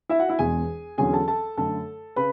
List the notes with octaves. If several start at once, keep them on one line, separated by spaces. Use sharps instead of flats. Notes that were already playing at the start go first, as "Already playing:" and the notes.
E4 E5
F#4 F#5
E4 E5
E1 E2 B2 G#3 G#4 G#5
E2 D3 F#3 C#4 G#4 G#5
A4 A5
A4 A5
F#2 D3 A3 A4 A5
C#3 B4 B5